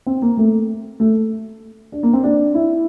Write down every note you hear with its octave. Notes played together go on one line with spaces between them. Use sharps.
C4
A#3
A3
A3
D4
A#3
C4
D4
E4